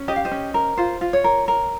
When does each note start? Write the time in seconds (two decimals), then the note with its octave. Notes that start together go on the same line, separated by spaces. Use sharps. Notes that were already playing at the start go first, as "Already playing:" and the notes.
Already playing: C#4
0.08 G4 D#5
0.16 F5
0.25 C5 D#5
0.31 C#4
0.54 A#4
0.77 F4 C5
1.01 F4
1.13 C#5
1.24 A#4
1.48 A#4